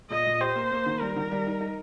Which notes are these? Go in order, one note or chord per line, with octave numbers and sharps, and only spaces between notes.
A#2 D#5
A#2
G4 C5
A#3
A#3
D#3
G3 A#4
D#3
G3
D#4
D#4